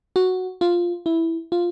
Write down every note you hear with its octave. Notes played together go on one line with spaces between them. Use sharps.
F#4
F4
E4
F4